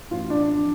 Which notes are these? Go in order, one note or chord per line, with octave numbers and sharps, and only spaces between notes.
A1 F4
D4
F2